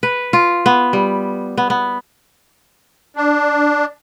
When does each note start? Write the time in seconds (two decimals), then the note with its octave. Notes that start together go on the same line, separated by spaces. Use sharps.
0.03 B4
0.33 F4
0.66 B3
0.93 G3
1.57 B3
1.70 B3
3.16 D4